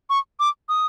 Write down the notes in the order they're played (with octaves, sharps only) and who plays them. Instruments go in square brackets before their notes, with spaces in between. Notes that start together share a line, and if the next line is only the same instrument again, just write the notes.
[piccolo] C#6
D6
D#6